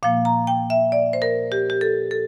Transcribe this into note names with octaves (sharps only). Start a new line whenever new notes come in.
A#2 F3 A#3 F5
A#5
G5
E5
D5
C5
A#4
G4
G4
A4
A4